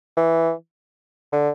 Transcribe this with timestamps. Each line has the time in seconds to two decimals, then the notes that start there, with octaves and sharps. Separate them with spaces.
0.17 E3
1.32 D3